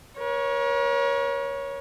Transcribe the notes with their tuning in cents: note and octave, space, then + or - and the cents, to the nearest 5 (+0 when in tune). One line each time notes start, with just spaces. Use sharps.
A#4 +45 C#5 +0